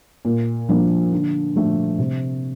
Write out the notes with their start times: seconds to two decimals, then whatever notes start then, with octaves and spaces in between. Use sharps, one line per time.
0.25 A#2
0.69 F3 A#3 D4
1.12 D3
1.56 F3 A3 D4
1.98 C3